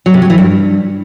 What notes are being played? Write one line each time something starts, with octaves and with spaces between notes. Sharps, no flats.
F#3
C3
F#3
E3
G2